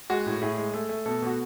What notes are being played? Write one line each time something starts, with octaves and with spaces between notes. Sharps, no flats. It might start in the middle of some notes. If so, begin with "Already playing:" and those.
G#3 F#4
A2
A2 G#4
G#3
A3
A3
B2 A4
B2 F#4